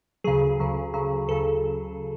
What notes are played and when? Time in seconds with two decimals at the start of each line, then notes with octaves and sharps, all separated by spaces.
0.24 D2 C#3 F#3 G#4
0.60 D2 C#3 F#3
0.94 D2 C#3 F#3
1.28 D2 C#3 F#3 A4